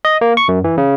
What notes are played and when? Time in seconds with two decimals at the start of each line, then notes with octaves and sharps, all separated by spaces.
0.05 D#5
0.21 A#3
0.37 C#6
0.48 F#2
0.64 E3
0.78 C#3